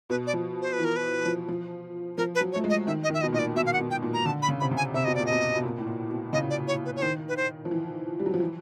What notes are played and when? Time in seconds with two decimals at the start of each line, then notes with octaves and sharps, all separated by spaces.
0.10 B2 B4
0.27 D5
0.33 F3
0.62 C5
0.73 B4
0.79 E3
0.85 A#4
0.96 B4
1.25 F3
1.48 F3
2.18 F3 A#4
2.35 B4
2.41 F#3
2.52 C#5
2.56 A3
2.64 G#3
2.70 D#5
2.87 D#3 E5
3.04 D#5
3.10 D#3 E5
3.21 B2 D#5
3.33 A#2 D#5
3.39 D5
3.56 B2 E5
3.66 F5
3.73 F#5
3.80 B2
3.91 G5
4.03 A#2
4.13 A#5
4.25 D3 A5
4.42 B5
4.48 C#3
4.60 C3 B5
4.71 C#3
4.77 G#5
4.94 C3 E5
5.05 B2 D#5
5.15 A#2 D5
5.26 D#5
5.32 B2
5.56 B2
5.63 A#2
5.78 A2
5.87 A#2
6.10 B2
6.33 C#3 D#5
6.50 D5
6.68 C#5
6.85 B4
6.96 C#5
7.02 D#3 C5
7.29 B4
7.37 C5
7.65 F3
7.71 E3
8.20 G3
8.26 F#3
8.34 F3
8.40 E3